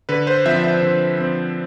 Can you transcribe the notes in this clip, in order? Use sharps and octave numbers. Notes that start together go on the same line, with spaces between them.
D3 B4
C5
F3 C4 E5
E5
D3
F3 C4